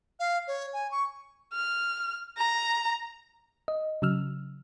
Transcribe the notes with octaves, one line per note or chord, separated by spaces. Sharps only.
F5
C#5
G#5
C#6
F6
A#5
D#5
C#3 F#3 E6 F6